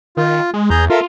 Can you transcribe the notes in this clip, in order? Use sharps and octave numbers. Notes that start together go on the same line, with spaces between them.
D#3 F4
G#3
E2 G#4 A#5 G6
F4 A4 A#4 E5